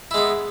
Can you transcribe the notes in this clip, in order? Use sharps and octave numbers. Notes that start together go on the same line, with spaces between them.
G#3 B3 E4